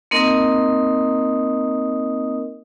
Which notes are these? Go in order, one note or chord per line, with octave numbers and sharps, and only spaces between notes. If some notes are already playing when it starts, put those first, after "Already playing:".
A#3 C4 D#4 A#4 D#5 D#6